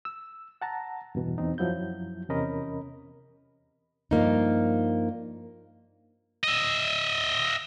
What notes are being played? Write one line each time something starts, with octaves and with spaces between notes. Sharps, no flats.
E6
F#5 A5 A#5
E2 G2 B2 E3
E2 C4 D#4
F#2 F3 F#3 E4 G6
E2 C3 C#4 A#4 D#5 B5
G2 F3 A#3 D#4
D#5 E5